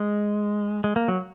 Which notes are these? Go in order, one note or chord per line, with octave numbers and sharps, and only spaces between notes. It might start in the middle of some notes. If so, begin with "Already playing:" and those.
Already playing: G#3
G#3
A#3
F#3